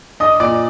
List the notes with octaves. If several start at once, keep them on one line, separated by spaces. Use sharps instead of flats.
D4 D#5 D#6
A#2 D5 D6